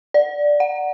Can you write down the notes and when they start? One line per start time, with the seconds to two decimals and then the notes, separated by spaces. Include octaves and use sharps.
0.14 D5
0.60 F#5